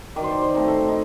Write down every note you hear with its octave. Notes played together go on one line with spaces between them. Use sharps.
D#3 D5
C5
D5
C5
A3 C4 D#4
A4
D#4